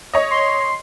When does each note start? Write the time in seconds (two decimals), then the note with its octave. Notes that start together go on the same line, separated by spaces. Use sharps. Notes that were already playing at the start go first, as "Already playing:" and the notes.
0.14 C#5 D#5
0.31 C6